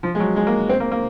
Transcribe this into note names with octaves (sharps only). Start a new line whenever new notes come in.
F3
G#3
F#3
G#3
A#3
C4
A#3
A#3